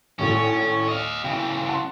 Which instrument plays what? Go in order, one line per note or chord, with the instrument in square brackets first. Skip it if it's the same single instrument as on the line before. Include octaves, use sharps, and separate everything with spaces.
[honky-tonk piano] G#1 A2 [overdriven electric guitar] C#4
[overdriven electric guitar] D#5 F5
[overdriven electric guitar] C#3 E3 [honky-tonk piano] G5
[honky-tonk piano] F#5 A5 C6